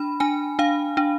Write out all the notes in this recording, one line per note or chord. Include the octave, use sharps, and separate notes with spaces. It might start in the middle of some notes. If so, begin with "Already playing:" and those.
Already playing: D4 B5
D4 G#5
D4 F5
D4